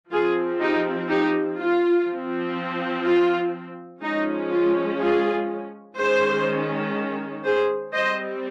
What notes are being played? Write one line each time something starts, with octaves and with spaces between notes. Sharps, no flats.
F3 C4 F4 G#4
D#4 G4
D#4 G4
F4
F3 C4
F4
F3 G#3 C#4 D#4
F4
F4 G#4
D#3 G#3 C#4 G#4 C5
G#4 C5
G3 C4 C5 D#5